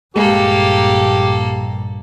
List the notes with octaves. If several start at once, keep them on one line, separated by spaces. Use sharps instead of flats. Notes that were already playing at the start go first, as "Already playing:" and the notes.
A#1 G2 G#3 A#3 G4 A4